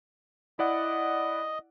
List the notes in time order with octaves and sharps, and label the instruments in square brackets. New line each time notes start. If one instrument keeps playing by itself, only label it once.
[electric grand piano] E4 D5 F#5 [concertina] D#5